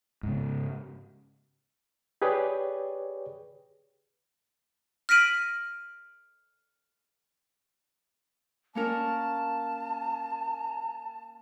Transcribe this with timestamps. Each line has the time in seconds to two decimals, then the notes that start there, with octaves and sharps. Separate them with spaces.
0.23 G#2 C#3
2.22 G4 G#4 B4 C#5 D5 G5
5.09 F6 A#6 B6 D7 D#7 F#7
8.75 A#3 C#4 A#4 A5